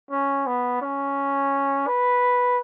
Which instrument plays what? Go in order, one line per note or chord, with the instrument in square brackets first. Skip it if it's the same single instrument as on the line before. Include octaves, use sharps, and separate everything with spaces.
[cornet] C#4
B3
C#4
B4